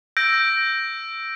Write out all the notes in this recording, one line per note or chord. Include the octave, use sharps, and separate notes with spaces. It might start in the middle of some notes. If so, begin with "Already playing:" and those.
E6 G6 A#6 D7